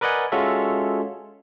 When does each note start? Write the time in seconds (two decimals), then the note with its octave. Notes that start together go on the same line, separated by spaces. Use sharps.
0.01 A#4 B4 D5 D#5 F#5 G#5
0.32 G#3 C#4 F4 F#4 A4 E5